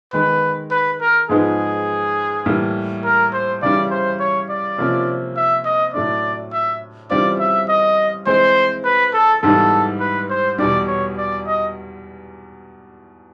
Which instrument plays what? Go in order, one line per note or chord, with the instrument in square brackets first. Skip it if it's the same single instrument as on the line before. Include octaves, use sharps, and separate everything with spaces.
[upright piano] D#3 G#3 B3 [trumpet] B4
[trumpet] B4
A#4
[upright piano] G#2 F3 G#3 B3 D#4 [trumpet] G#4
[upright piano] A2 E3 G3 A#3
[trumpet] A#4
C5
[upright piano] C#3 E3 G3 [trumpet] D5
[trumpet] C5
C#5
D5
[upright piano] C3 F3 A#3 C#4 F4
[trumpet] E5
D#5
[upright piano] A2 F#3 A3 D4 [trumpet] D5
[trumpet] E5
[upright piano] C#3 E3 G3 C4 F4 [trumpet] D5
[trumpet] E5
D#5
[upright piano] E3 G#3 C4 [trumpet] C5
[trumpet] B4
A4
[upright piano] G#2 E3 G3 B3 [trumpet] A4
[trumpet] B4
C5
[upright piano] E2 B2 G3 [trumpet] D5
[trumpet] C#5
D5
D#5